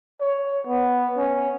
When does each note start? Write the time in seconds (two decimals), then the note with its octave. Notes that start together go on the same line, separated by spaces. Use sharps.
0.21 C#5
0.67 B3
1.17 C#4